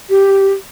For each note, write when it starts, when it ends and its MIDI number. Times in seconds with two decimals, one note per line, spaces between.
0.09 0.52 67